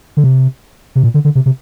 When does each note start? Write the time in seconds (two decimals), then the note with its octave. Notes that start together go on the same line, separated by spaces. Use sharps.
0.17 D3
0.24 C3
0.95 C3
1.03 A#2
1.14 D3
1.25 D3
1.35 C3
1.46 C3